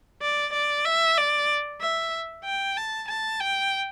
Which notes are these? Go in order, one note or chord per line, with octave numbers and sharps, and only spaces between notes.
D5
D5
E5
D5
E5
G5
A5
A5
G5